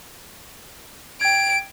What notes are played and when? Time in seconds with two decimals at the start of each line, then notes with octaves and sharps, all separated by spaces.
1.21 G5 G#6 D7